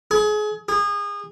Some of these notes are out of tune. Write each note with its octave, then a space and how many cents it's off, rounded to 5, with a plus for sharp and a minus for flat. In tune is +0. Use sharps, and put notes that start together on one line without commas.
G#4 +30
G#4 -30